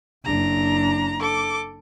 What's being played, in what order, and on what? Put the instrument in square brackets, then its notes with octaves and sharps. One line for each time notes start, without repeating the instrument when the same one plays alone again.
[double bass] F#1 D4 [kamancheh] A#5
[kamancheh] A4 D6